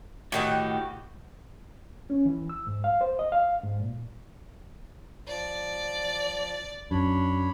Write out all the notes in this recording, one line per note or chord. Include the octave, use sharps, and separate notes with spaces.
A2 D#3 F#4 G4 F#5
C#4
E3
E6
G#2
F5
C5
D#5
F5
G#2
A#2
F3 D5
F#2 D4 C#5 B5